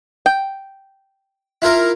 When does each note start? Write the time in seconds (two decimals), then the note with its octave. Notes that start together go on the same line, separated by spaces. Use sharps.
0.26 G5
1.62 E4 F4 A#4